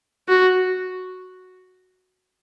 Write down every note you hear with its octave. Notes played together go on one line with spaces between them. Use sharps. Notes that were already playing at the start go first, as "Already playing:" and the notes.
F#4